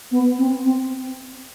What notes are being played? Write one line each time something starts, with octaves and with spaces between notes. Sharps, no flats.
B3
C4
C4